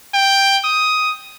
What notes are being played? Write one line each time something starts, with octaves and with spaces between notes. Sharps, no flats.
G5
D#6